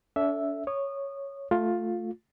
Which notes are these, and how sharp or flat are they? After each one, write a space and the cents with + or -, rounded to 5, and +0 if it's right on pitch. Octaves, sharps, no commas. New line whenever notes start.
D4 -45 A4 +0 E5 +0
C#5 +0 D#6 -25
A3 +0 F4 +15